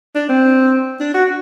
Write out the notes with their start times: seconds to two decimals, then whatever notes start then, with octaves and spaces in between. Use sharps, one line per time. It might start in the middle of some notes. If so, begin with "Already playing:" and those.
0.15 D4
0.29 C4
1.00 D4
1.14 F#4